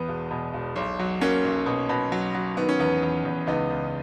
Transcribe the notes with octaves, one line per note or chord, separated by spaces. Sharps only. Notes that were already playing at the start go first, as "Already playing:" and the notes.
Already playing: E2 B3
E1
B2
E1
B1
F#3
F#3 A#3 C#4
B1
B2
B2
F#3
F#3
D#3 B3
C#4
E2 B3
E2
E2
C#2 B3 D#4
C#2